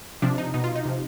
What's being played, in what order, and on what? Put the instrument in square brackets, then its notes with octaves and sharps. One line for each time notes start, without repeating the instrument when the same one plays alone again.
[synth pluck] C3 F3 D4
D#4
B2 D#4
F4
D#4
C3 F3